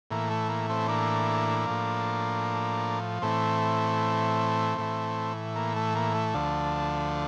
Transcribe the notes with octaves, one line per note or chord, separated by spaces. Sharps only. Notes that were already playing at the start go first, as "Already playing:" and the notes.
A2 E3 A#3
A3
A#3
A3 C4
A#3 D4
A2 F3
A2 E3 A3 C4
A2 E3
A#3
A3
A#3
A3
D2 D3 F3